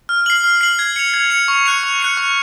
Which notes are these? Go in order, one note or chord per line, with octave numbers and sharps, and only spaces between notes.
F6
C7 F#7
F6
C7 F#7
G#6
C#7 F7
G#6
C#7 F7
C#6
F#6 C#7 F7
C#6
F#6 C#7 F7
C#6